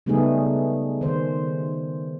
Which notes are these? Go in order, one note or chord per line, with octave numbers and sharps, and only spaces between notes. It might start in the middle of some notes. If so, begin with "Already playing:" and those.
C#3 G3 A3 B3 D#4 G#4
D#3 C5